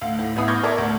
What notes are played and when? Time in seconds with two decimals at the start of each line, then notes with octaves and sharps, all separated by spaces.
0.01 D2 F5
0.19 A2
0.36 A1 B3 E4 B5 D#6 C7
0.48 C#6 D6 F6 G6 G#6 A#6
0.63 A#4 D5 E5 A5 C#6
0.78 D2